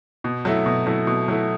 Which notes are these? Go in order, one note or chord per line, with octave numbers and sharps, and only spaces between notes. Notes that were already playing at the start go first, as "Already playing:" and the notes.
B2
F#3 A3 E4
B2
F#3 A3 E4
B2
F#3 A3 E4